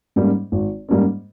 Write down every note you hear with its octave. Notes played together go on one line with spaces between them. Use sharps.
G#2 G3 A#3 C#4
G#1
G#2 G3 A#3 C#4